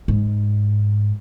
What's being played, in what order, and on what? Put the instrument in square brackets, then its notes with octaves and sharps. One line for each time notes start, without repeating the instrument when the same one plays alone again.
[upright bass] G#2